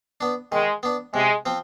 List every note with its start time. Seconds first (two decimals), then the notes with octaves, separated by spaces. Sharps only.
0.21 B3 D4
0.52 D#3 G#3
0.83 B3 D4
1.14 C3 G#3
1.46 F3 C4